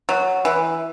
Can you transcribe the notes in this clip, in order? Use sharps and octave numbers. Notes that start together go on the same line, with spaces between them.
F#3
E3